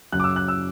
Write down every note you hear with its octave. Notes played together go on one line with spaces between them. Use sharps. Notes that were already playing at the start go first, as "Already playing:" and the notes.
F#2 C#3 F#3 F#6
D6
E6
F#6
E6